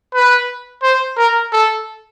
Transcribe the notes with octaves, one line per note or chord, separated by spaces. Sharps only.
B4
C5
A#4
A4